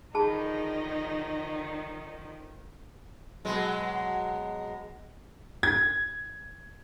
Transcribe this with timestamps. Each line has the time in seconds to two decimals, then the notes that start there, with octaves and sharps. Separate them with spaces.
0.15 D3 D#3 F3 D#4 G#4 A5 B5
3.45 B2 F#3 G#3
5.63 G#6